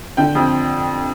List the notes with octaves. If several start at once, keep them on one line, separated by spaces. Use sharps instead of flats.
D3 G5
F2